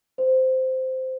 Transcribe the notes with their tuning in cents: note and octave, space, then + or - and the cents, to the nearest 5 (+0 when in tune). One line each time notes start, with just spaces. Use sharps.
C5 -10